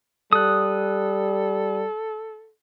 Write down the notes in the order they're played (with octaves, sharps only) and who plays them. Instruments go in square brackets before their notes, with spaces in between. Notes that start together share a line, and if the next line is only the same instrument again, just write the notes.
[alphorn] G3 [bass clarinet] A4 [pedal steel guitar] D#6 F#6